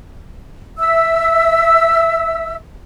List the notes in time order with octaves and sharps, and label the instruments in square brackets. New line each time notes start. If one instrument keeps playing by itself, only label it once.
[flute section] E5 E6